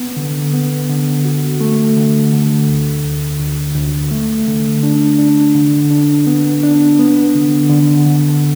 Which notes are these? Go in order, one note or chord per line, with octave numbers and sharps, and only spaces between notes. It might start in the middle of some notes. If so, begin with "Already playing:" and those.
Already playing: B3
D3
B3
D3
F#4
A3
D3
D3
D2
D2
D2
D2
A3
D3
D4
D4
D3
D4
B3
D4
B3
D3
D3
D3